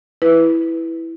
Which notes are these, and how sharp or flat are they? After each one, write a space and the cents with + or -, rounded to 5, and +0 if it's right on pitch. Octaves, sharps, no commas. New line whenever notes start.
E4 +0 B4 +0